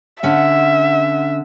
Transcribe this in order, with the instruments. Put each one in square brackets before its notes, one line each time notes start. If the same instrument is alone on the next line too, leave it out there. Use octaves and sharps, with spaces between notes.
[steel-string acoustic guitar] D3 C#4 F#5 [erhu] E5